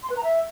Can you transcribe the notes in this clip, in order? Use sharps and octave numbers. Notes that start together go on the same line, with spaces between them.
C6
B4
A#5
E5